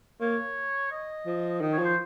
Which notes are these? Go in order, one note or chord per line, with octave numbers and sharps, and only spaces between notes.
A#3 C#5
D#5
F3
D#3 D#5
C#5
F3
C5